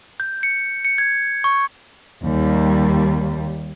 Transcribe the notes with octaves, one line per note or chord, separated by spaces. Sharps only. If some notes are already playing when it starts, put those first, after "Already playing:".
G6
C#7
C#7
G#6
C#6
D#2 G3